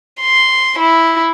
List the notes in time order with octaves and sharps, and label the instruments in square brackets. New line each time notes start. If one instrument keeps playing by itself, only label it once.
[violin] C6
E4